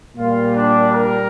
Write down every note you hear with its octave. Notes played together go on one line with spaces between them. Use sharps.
A#2 G3 F4
D4
A#4